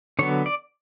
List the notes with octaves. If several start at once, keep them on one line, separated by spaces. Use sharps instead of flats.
D3 F#3 B3 C#5
D5